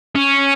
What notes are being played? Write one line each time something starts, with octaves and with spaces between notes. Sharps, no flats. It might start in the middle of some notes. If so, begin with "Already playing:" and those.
C#4